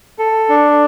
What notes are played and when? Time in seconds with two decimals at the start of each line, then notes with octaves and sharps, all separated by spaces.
0.19 A4
0.49 D4